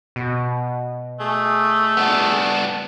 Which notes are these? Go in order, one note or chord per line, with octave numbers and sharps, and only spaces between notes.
B2
A3 G#4
B3 D4